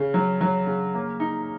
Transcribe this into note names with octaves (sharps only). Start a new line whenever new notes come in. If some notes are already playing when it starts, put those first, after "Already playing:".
Already playing: C#3
F#3
F#3
C#3
A#3
D#4